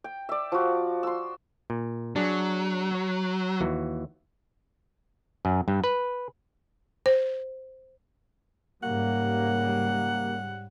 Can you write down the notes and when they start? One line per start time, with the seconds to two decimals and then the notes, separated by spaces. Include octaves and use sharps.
0.04 G5
0.29 D5 E5
0.52 F3 F#4
1.03 C6 E6
1.70 A#2
2.16 F#3 D4 G#4
2.95 C#5
3.61 D#2 E3 F#4
5.45 F#2
5.68 G2
5.84 B4
7.06 C5
8.83 G#2 C#3 G3 A#3 F#5